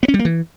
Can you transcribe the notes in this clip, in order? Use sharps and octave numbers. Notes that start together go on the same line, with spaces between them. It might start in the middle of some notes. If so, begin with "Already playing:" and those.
B3
C#4
G3
A#3
E3